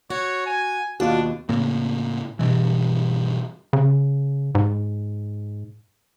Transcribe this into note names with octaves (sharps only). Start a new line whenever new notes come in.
F#4 C#5
G#5
D#2 B2 D4 F4 F#4
A2 C#3 A#3
G2 B2 E3
C#3
G#2